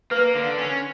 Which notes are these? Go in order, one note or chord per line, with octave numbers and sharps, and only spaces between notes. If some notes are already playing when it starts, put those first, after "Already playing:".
A#3 B4
D3
C#4